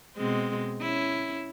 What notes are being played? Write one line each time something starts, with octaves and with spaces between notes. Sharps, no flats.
B2 G#3 C4
C#4 E4